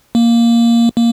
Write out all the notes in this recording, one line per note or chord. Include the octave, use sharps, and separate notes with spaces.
A#3
A#3